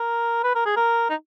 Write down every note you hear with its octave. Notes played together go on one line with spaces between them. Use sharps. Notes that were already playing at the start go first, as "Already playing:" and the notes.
Already playing: A#4
B4
A#4
G#4
A#4
D#4